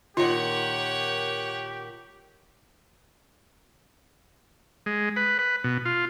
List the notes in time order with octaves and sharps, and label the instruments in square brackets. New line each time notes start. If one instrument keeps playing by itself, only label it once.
[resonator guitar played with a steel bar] A#2 D#3 [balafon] F4 [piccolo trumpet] G4 [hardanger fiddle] C#5 F#5
[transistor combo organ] G#3
B4
B4
B2
F4